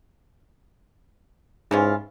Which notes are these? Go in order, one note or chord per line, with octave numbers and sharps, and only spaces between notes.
G#2 E3 C#4 F4